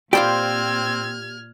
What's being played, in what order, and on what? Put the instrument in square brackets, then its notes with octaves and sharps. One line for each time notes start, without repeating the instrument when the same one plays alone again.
[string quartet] A#2 F6 G#6 [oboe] C4 [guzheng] F4 C5 D5 [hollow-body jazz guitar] G4